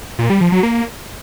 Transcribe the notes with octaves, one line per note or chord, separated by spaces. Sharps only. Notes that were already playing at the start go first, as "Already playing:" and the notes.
A#2
G3
F3
F#3
A#3